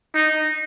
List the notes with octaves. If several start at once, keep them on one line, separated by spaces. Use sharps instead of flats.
D#4